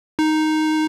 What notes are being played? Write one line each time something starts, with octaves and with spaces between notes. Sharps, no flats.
D#4